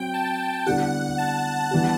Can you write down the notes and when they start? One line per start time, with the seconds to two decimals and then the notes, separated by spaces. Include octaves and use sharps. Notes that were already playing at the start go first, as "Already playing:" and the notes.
Already playing: F#3 C4 G5
0.14 A5
0.66 D3 G3 B3 E4 G4 F#5
1.18 A5
1.71 E3 G3 B3 D4 G4